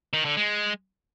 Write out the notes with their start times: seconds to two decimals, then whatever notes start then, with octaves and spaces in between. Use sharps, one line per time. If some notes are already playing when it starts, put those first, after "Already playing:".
0.13 D#3
0.25 D3
0.37 G#3